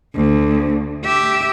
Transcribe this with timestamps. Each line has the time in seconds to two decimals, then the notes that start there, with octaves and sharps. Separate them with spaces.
0.14 D2
1.05 G4 E5